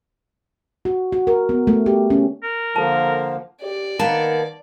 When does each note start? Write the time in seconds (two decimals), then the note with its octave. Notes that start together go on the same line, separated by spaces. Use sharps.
0.85 F#4
1.12 F#4
1.27 A#4
1.49 B3
1.67 A3
1.86 G4
2.10 C#4
2.43 A#4
2.76 D3 F3 A#3 A4 A5
3.62 G4 D5
3.99 D#3 A#3 B3 A5